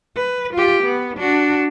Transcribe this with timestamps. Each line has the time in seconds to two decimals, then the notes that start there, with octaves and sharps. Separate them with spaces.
0.15 B4
0.54 F4 G4
0.84 B3
1.17 D4 F#4